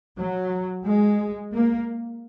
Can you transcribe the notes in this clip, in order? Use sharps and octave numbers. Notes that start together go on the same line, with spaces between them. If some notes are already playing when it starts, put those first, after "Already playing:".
F#3
G#3
A#3